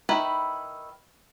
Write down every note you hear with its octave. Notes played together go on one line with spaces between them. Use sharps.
D#3 E4 B4